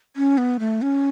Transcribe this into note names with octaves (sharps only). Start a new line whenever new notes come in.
C#4
B3
A3
C#4